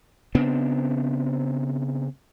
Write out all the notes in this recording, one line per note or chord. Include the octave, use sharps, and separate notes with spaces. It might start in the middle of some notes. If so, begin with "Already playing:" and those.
C#3 B3 C4 D4